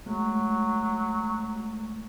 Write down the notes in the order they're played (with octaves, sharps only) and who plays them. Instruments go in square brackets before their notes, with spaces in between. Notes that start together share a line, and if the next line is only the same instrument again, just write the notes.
[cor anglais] F#3 [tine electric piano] G#3 A3